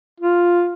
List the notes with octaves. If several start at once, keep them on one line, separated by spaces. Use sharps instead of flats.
F4